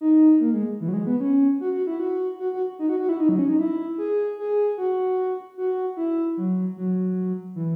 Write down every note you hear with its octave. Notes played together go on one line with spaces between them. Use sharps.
D#4
A#3
G#3
E3
F#3
G#3
B3
C#4
F#4
F#4
E4
F#4
F#4
F#4
D#4
F#4
F#4
E4
D#4
F#3
C#4
D#4
E4
G#4
G#4
F#4
F#4
E4
F#3
F#3
E3